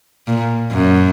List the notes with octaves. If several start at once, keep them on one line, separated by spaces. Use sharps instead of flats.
A#2
F#2